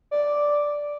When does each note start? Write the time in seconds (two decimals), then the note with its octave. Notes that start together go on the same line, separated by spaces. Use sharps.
0.11 D5